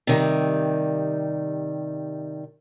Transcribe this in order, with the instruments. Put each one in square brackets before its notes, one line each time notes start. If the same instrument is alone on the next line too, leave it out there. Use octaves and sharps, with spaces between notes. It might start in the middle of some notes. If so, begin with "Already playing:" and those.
[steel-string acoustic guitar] C3 D#3 G3